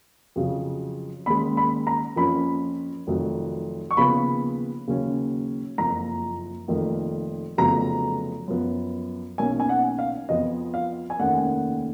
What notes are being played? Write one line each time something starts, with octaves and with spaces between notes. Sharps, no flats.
F2 C#3 F#3
D#2 D#3 G#3 C#4 B5
B5
A#5
F2 F3 A#3 C#4 B5
F1 F2 D#3 F#3
C#6
D#2 C#3 F3 B3 B5
D#2 C#3 F#3 C#4
F#1 F2 F3 A#3 A#5
F1 F2 D#3 A#3
F1 F2 C#3 F#3 B3 A#5
F#2 F3 B3
B1 B2 A#3 C#4 G#5
G#5
F#5
F5
F2 F3 B3 D#5
F5
G#5
F1 D#2 D#3 A#3 C#4 F#5